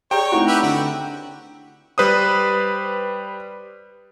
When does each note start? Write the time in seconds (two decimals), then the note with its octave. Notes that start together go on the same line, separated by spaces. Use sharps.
0.11 G4 G#4 C#5 D5 G5 A#5 G6
0.32 A3 C4 D#4 E4 F#4
0.47 G4 B4 E5
0.63 D3 F#4
1.98 G3 B4 C5 D#6